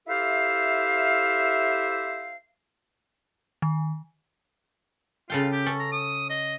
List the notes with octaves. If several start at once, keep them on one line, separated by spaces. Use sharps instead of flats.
E4 G4 A4 C5 E5 F5
D#3
C#3 F4 A4 G5
G4
C#4 A4
A#5
D#6
D#5